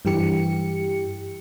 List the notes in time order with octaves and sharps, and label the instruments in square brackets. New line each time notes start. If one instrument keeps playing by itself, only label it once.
[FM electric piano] G2 E3 G4 C#7